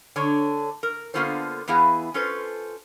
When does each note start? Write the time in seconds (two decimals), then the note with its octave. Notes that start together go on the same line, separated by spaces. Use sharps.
0.16 D3 D4 C#5
0.83 A#4
1.14 D3 A#3 B3 F4 A4 C5
1.68 E2 E3 B3 E4 G#4 F5
2.14 C#4 F4 A4 B4 C5